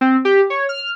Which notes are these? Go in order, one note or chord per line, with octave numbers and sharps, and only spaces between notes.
C4
G4
C#5
F6